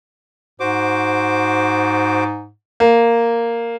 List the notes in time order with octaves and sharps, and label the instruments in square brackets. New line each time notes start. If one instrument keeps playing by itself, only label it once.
[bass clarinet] G#2 [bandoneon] F#4 C5 D6
[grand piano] A#3